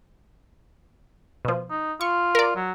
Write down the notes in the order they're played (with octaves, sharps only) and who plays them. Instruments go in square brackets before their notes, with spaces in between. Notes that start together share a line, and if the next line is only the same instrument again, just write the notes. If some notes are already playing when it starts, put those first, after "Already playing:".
[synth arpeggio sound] B2 F3
[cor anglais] D#4
[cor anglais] F4 [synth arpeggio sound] C#6
[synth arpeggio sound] A#4 D5
[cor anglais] F#3